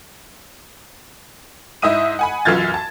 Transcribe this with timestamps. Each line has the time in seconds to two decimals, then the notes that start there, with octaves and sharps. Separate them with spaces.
1.82 G#2 E4 D#5 E5 D#6 D#7
2.19 F#5 G#5 B5
2.45 B1 F#2 E3 F4 G#6 A6
2.74 A5